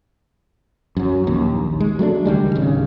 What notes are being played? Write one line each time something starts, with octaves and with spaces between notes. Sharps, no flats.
F#2 F#3
A#1 D#2
G#3
F#3 A3 C4 D4
C#2 D#3 G3 G#3
D1 C#3